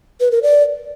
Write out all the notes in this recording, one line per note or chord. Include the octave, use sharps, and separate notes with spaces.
B4
A#4
D5